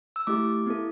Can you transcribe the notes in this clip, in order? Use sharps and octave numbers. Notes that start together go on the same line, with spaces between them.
E6
A3 E4 G4 D6
B3 E4 A4